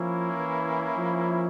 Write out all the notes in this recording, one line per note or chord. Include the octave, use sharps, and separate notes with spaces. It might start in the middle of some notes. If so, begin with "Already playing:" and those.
Already playing: F3 A#3 C#4 E4
E3
F3